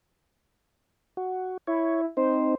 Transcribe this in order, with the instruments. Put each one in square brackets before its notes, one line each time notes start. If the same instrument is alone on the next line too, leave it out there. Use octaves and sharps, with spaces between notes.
[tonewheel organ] F#4
[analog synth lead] E4 [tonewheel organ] C#5
[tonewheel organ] C4 D#4 [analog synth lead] C5